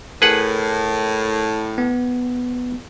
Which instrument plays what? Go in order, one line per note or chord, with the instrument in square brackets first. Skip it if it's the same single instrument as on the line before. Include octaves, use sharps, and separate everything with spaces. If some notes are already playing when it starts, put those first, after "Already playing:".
[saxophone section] A2 [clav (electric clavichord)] G#4 B4 F#5 [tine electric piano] A#4
[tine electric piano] B3